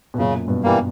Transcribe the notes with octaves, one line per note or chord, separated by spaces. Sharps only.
B2
F#2 A#2 C#3
G2 B2
E3 G3 A#3